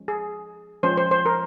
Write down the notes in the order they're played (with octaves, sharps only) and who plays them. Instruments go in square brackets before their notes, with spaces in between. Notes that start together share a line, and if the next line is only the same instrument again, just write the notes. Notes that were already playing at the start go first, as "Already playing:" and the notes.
Already playing: [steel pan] F3 G#3 C#4
G#4
F3 G#3 C#4 C5
C5
C5
A#4